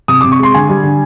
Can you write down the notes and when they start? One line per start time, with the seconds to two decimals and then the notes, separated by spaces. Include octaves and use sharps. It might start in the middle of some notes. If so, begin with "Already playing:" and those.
0.08 C3 D#6
0.21 D6
0.24 C3
0.32 C#6
0.39 G#3 C6
0.54 D3 G#5
0.69 G3
0.83 D3